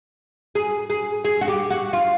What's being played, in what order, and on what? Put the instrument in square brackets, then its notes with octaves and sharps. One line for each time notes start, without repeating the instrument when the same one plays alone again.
[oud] G#4
G#4
G#4
F#4
G4
F#4
F4